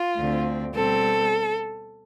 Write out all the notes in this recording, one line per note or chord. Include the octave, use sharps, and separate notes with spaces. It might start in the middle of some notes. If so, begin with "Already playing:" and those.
Already playing: F4
D2 D3 A3 C4
B2 G3 C4 A4